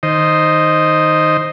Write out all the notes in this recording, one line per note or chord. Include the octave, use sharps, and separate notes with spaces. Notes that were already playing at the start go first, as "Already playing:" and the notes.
D#3 C5 D#5